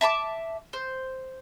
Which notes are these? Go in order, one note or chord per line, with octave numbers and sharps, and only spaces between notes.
E5 A5 B5 D6
C5